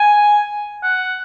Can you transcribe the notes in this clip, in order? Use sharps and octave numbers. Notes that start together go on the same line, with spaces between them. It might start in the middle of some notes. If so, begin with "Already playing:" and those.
Already playing: G#5
F#5